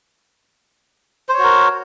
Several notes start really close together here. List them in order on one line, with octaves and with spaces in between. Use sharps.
C5 C#5 F#4 A#4